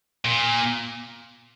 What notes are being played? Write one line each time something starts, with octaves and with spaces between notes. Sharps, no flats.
A#2